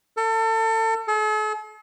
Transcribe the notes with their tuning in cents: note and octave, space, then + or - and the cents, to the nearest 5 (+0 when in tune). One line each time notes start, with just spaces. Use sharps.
A4 +30
A4 -45